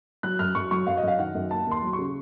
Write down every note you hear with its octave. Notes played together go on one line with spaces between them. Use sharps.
F#3 F#6
F#2 F6
F#2 C#6
F#3 C#6
F#2 F5
D#5
F#2 F5
D#3 F#5
F#2
A#3 A5
D#2 C6
F#3
C#6
C#3